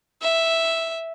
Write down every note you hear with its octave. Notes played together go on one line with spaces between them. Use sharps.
E5